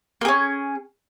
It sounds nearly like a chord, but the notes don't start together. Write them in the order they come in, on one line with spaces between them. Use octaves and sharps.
A#3 G#4 C#4